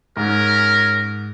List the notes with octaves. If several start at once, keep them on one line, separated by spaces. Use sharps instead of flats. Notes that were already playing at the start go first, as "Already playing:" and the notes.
G#2 C#4 A#4